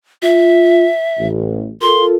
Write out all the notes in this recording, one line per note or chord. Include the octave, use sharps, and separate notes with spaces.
F4 E5
A1
F4 A4 A#4 C6